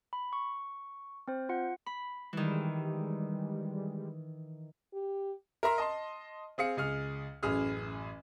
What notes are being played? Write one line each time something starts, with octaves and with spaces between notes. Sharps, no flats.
B5
C#6
C4 C5
F4 F#5
B5
D#3 E3 G3 G#3
G4
A#4 E5 A#5 C6
D#5 A5 C6
C4 G#4 F5 C#7
C#2 G#4 F6
A1 F#2 G#4 F6